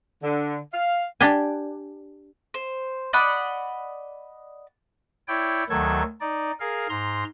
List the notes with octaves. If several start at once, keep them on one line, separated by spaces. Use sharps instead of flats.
D3
F5
D4 G4 G5 G#5
C5
D5 D#5 F#5 B5
E4 C#5 D5 G5
D2 D#3 F#3 A4 G#6
D#4 D5
G#4 A#4 F5
G#2 A#5 C6